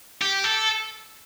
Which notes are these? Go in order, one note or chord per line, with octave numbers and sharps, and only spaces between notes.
G4
A4